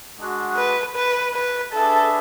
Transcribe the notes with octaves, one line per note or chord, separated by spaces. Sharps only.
G#3 D4 F#4
B4
B4
B4
D4 G#4 A4 B4 E5